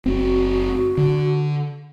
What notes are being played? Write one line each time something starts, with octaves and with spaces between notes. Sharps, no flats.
F#1 C4 F#4
D3